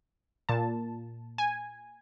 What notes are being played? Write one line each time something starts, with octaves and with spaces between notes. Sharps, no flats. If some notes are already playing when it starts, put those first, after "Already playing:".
A#2 A5
G#5